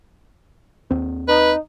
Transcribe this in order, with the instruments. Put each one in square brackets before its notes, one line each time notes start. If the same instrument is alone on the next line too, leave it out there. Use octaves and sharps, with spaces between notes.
[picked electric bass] D#2 C4
[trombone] D#4 [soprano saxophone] B4